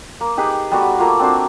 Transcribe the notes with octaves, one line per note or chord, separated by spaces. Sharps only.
A#3
D#4 G4 G#4 B4
G3 A3 B3 F#4
A3 A#3 F4
C4 D4 F#4 C5